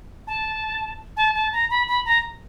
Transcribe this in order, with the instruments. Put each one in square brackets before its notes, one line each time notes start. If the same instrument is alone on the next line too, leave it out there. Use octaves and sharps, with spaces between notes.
[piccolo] A5
A5
A5
A#5
B5
B5
A#5